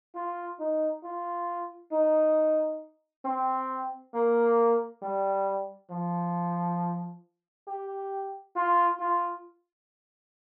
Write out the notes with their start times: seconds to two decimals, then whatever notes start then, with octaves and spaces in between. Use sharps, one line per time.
0.15 F4
0.60 D#4
1.03 F4
1.92 D#4
3.25 C4
4.14 A#3
5.02 G3
5.90 F3
7.68 G4
8.56 F4
9.00 F4